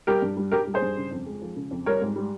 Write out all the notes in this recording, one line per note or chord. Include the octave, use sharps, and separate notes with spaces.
G3 G4 A#4
G2
G3
G2 G4 A#4
G3
G#4 C5
G2
C#3
F2
G#3
F3
C#3
F2
G3 A#4 C#5
G#2
G3